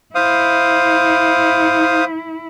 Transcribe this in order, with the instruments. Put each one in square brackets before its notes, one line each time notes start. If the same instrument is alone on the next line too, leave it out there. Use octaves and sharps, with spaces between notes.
[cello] E4 [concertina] C5 F5 D#6